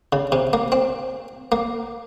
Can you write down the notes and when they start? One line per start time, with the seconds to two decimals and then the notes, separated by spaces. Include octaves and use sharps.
0.13 C#3
0.32 C3
0.53 A#3
0.72 C4
1.52 A#3